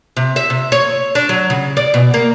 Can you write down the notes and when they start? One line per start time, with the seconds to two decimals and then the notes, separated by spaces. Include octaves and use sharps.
0.17 C3
0.36 E5
0.50 C3
0.72 C#5
1.15 D4
1.29 F#3
1.50 C#3
1.77 D5
1.94 B2
2.14 A#3